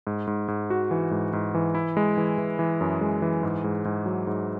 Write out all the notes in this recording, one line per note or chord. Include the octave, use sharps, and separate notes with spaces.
G#2
G#2
G#2
F#4
E3
G#2
G#2
E3
E4
G#3
E3
E3
E3
F#2
G#3
E3
G#2
G#2
G#2
F#3
G#2